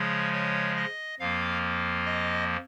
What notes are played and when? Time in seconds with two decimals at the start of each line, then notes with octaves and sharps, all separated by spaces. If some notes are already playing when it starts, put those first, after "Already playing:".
Already playing: C#3 F3 G#3 C#5
0.33 C#5
0.76 D#5
1.19 F2 F3 A#3 F5
2.06 D#5